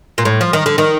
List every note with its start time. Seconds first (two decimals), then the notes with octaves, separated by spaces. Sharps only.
0.18 A#2
0.25 A2
0.41 F3
0.53 D#3
0.66 D3
0.78 D#3